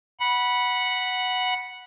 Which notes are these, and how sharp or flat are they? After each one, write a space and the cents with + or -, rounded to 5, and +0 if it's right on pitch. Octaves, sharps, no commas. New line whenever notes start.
F#5 +0 B5 -15